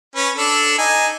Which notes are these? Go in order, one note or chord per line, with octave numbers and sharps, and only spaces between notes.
C#4 B4
D4 A4
D#4 G#5